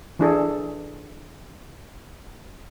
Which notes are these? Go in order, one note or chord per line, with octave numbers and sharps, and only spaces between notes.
E3 D4 G#4 A4